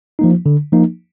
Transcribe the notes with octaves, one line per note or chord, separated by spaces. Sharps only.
F3 A#3 D#4
D3
F3 A#3 D#4